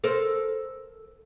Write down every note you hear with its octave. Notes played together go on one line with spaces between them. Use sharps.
A4 A#4 C5